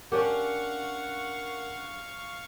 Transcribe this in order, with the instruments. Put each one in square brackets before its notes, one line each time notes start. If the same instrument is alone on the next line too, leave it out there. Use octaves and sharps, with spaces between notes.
[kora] C#4 D4 G4 [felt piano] A#4 [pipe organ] F5 C#6 [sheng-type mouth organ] F#5